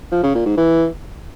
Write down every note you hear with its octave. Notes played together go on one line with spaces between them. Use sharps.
F3
C#3
A#2
G#2
E3